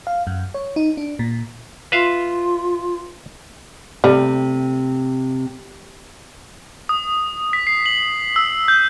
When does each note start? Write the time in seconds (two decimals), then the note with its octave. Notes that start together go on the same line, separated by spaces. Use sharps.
0.07 F5
0.27 F#2
0.54 C#5
0.76 D#4
0.97 D4
1.19 A#2
1.92 F4 B4 E5 F5
4.04 C3 G3 A3
6.89 D#6
7.53 B6
7.67 C7
7.86 F#7
8.36 E6
8.68 G6